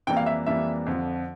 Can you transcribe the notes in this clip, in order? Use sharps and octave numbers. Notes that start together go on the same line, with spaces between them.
F2 E3 G3 A#3 D4 G5
F5
E5
F2 E3 G3 A#3 D4 E5
F2 D3 F3